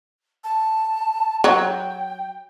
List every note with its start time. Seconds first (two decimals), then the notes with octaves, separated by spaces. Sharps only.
0.44 A5
1.44 F#3 G5